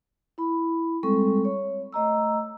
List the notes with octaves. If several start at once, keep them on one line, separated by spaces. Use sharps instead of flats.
E4 B5
G3 G#3 C4 A4 C#6
C#5
A3 D#5 A#5 E6